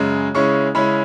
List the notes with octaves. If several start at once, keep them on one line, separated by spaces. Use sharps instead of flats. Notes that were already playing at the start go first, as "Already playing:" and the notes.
Already playing: F#2 C#3 G#3
C#3 G#3 C#4 E4 C#6
C#3 G#3 C#4 E4 B5